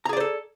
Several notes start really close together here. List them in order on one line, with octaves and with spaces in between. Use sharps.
A#5 G#4 D5 C5 A4